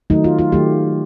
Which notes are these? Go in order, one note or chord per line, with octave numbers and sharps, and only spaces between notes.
D#3 F#3 A3 D#4
F4
F4
D#3 F#3 A3 G4